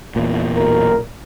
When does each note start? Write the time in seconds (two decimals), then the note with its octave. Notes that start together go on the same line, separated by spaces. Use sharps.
0.16 E2 A#2
0.56 B1 A#4